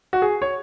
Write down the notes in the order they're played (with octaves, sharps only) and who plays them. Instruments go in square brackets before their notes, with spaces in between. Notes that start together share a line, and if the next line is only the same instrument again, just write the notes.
[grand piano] F#4
G#4
C#5